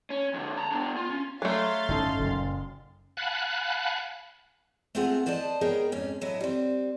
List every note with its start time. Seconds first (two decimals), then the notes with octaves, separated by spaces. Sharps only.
0.10 C#4
0.34 F2 D3
0.57 A5 A#5
0.71 B3 D4
0.96 F4
1.10 C#4
1.42 F#3 A3 F5 C6 A6
1.88 G1 A2 C#4 D#4 A4
2.20 F#1 F#2 A#2
3.17 F5 F#5 G#5 A5 B5 F#6
4.95 A3 B3 C4 F4 G#4 F#5
5.26 B4 C5 D5 D#5 A5
5.61 B3 D#4 G#4 A#4 C#5 G5
5.92 F2 G#2 C#4
6.21 A2 F#3 E4 D#5
6.41 G3 C4